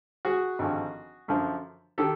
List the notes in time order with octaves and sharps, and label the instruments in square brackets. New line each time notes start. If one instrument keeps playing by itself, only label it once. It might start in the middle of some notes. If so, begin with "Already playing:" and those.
[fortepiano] F#4 G#4
G#1 G2 D3 F3
F#2 D3 F3
D#3 G4 A4